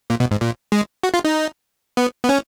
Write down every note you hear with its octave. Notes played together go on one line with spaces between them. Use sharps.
A#2
B2
G#2
A#2
G#3
F#4
F4
D#4
B3
B3
C#4